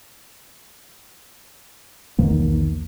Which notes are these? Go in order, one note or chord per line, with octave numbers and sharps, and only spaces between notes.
B1 E2 D#3 A#3